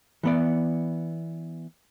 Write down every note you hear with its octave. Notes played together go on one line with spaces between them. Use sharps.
E3 B3 D5